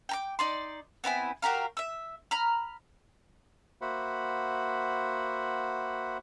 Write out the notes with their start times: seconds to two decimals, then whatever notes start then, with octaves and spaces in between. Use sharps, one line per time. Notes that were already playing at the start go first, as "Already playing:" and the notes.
0.09 G5 A#5 D6
0.39 D#4 D5 C6
1.04 B3 C4 E4 G#5
1.42 F#4 G4 A#4 F5
1.77 E5 E6
2.31 A#5 B5 F6
3.81 A#3 F#4 C5 E5 F#5 B5